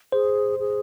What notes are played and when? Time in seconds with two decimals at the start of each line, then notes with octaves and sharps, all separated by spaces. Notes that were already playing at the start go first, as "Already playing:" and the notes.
0.12 G#4 C5
0.60 G#4